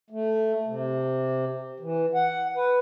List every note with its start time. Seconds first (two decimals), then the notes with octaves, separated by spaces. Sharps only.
0.10 A3
0.66 C3
1.80 E3
2.14 F#5
2.55 B4